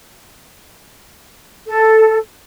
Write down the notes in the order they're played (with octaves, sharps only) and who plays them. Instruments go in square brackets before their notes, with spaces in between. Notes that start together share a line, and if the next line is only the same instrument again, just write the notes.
[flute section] A4